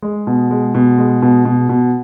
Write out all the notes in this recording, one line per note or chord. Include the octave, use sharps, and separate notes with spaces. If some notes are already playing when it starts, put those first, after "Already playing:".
G#3
B2
G#3
B2
G#3
B2
B2
B2